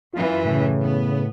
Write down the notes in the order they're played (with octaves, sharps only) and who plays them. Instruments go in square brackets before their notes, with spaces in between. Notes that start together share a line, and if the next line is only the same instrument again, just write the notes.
[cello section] F#2 E3 [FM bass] F4
[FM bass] A2 [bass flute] C#3
[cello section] B3